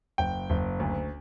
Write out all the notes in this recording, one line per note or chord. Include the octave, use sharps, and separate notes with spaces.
F#1 G5
F#1
D2